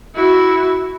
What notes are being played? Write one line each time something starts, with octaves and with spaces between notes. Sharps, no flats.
E4 F#4